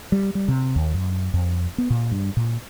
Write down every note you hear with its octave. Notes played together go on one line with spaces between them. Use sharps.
G3
G3
C3
D#2
F#2
F2
B3
A#2
G2
A#2